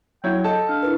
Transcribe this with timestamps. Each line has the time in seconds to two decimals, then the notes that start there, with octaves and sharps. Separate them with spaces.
0.24 F#3 E4 C#5 G5
0.44 A4 D#5 A5
0.69 D4 F5
0.83 E4 A#4 B4